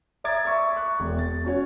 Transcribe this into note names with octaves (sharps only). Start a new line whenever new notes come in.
D5 E5 A#5 D6 G#6 A6
E5 C#6
C#6 F#6
E1
A6
C#4 F#4 C#5